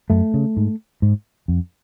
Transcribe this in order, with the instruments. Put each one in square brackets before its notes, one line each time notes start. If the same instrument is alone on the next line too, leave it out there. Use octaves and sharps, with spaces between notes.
[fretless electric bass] F#2 A3
C#3
G#2
G#2
F2